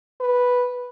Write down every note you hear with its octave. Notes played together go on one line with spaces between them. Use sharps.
B4